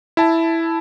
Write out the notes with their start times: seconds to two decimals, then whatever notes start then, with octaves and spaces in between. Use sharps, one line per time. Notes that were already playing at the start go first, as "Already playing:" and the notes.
0.17 E4 A5